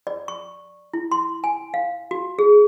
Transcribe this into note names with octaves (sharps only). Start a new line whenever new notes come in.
D5
C#6
E4
C6
G#5
F5
F#4
G#4